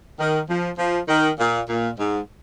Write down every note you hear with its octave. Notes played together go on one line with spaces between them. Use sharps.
D#3
F3
F3
D#3
A#2
A#2
G#2